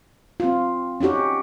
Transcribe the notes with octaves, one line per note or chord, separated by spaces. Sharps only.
C4 F4
C#4 D#4 F#4 G4